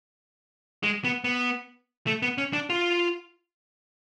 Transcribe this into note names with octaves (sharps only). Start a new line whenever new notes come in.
G#3
B3
B3
A3
B3
C#4
D4
F4